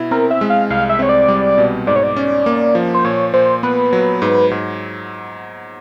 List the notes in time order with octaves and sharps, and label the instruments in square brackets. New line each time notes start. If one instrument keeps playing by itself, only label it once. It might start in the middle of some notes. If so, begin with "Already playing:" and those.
Already playing: [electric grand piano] B2 E4
[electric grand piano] C4 [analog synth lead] A#4
[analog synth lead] E5
[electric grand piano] G#3
[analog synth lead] F5
[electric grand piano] C2 [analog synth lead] F5
[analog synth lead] E5
[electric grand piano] C4 [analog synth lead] C#5
[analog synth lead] D5
[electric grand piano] G3
B2
[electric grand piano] G#2 [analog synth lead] D5
[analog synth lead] C#5
D5
[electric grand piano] C#4
A#3
F3
[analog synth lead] C5
[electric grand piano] A#2 [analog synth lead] C#5
[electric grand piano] A#2 [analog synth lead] C5
[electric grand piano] B3 [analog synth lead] B4
[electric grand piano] F#3
G#2
G#2